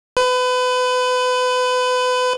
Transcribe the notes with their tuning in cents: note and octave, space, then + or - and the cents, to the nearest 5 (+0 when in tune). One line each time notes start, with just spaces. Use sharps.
B4 +30